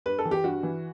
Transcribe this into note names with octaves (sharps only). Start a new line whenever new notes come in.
G2 B4
A4
E3
G4
G2 F#4
E3